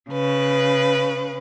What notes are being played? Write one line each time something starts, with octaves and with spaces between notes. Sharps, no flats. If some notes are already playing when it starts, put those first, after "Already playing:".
C#3 B4